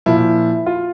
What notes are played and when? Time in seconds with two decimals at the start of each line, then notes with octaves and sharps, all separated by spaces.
0.06 A#2 F3 E4
0.66 F4